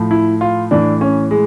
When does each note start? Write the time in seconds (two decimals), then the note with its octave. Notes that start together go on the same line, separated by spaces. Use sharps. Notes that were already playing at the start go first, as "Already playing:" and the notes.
Already playing: A2 F3
0.11 E4
0.41 F4
0.71 A2 E3 D4
1.01 C#4
1.31 G#3